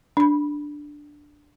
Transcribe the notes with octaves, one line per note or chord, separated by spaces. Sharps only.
D4 B5